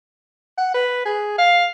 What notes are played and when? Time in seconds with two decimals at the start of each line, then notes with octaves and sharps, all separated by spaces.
0.58 F#5
0.74 B4
1.05 G#4
1.38 F5